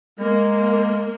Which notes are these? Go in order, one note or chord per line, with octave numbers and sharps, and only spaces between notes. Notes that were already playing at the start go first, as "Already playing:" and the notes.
G#3 A#3